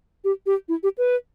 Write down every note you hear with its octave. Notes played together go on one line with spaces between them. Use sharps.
G4
G4
E4
G4
B4